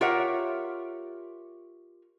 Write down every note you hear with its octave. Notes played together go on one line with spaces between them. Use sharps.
F4 G4 A#4 C#5 E5 F#5